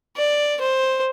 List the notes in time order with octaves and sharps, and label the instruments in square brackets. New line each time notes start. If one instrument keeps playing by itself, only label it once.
[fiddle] D5
C5